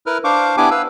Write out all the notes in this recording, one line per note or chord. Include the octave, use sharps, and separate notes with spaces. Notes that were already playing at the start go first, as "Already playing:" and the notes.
E4 A#4 B4 F6
D4 C5 F5 C#6 D6
B3 D4 E4 G4 G#5 D6
B4 F5 E6